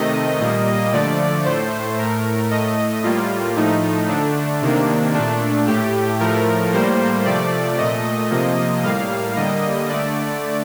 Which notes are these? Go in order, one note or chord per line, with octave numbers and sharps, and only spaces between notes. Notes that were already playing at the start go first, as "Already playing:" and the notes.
Already playing: C3 D#3 A3 D#5
A#2 G3 A#3
D3 F3 A3 D5
A2 A3 C5
A2 A3 A#4
A2 A3 D#5
A2 G3 A#3 F4
A2 F3 A3 D#4
D3 A3 D4
C3 D#3 A#3
A#2 A3 D4
A2 A3 G4
A2 F3 A3 A#4
A2 G3 A#3 C5
C3 F3 A3 D5
A#2 A3 D#5
C3 F3 A#3
A2 G3 A#3 F5
D3 G3 A#3 D#5
D3 A3 D5